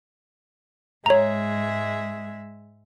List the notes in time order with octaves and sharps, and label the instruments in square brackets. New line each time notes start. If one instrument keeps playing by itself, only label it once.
[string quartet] G#2 G#3 E5 [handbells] C#5 A#5